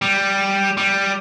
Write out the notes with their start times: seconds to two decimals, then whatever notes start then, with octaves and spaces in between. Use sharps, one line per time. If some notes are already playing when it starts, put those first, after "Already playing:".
0.02 G3
0.77 G3